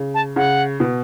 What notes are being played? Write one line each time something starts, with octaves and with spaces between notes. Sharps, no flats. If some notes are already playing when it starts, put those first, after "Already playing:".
Already playing: C#3
A5
C#3 F#5
B2